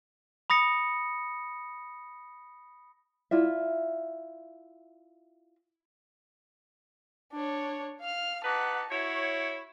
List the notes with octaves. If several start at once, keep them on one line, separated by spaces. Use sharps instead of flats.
B5 D#6 A#6 C#7
E4 F4 D5 E5
D4 C#5
F5 F6
D#4 G4 B4 F#5 A5
E4 F#4 C#5